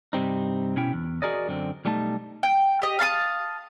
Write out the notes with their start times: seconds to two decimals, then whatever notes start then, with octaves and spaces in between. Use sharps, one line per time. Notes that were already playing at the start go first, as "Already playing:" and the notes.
0.13 G2 C3 G3 C4 D#4
0.76 B2 C#4 E4 G5
0.93 E2
1.22 F#4 G#4 A#4 D5 D#5
1.48 F#2 D3 C4
1.85 B1 G3 A3 D#4 A5
2.43 G5
2.82 G4 D#5
2.99 F5 A5 C6 D#6